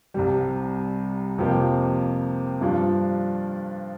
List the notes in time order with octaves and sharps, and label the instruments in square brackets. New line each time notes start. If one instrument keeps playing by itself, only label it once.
[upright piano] C2 C3 G3
F2 C3 F3 A#3 G4
G2 F3 D4 F4